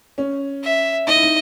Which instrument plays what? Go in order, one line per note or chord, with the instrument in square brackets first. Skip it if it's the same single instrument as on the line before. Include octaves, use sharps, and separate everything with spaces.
[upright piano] C#4
[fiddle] E5
[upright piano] D#4 [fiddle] D#5
[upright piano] E4
D#4